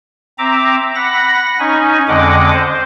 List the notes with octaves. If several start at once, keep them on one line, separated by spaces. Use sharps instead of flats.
C4 E5 A#5 D6
F#5 B5 A#6
C#4 D#4 G#5
F2 D3 G#3 D#5 F#5 D6
C5